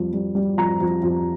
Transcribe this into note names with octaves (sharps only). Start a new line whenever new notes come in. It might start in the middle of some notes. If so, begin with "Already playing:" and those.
Already playing: F2 G3
G3
G3
F2 A#5
F2
F2